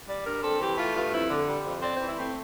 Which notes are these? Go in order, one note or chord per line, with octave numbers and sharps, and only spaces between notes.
G3 D5
G2 A#4
C4 A4
E3 G4
A3 F4
G2 F4
F2 E4
D3
G3
F2
C4 D5
C5
E3
E4
A3 C4